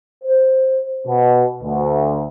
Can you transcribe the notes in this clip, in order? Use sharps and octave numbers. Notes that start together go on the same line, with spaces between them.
C5
B2
D2